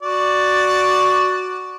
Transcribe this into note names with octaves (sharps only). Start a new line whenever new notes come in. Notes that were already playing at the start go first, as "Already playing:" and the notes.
F#4 D5